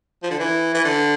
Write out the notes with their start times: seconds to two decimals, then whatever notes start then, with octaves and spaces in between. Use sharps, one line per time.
0.23 F3
0.31 D3
0.39 E3
0.74 E3
0.85 D3